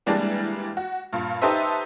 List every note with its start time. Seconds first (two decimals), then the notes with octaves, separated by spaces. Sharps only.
0.06 E3 G3 G#3 A#3 D4
0.77 F#4
1.13 G2 A#2
1.42 D#4 G4 A4 B4 C5 E5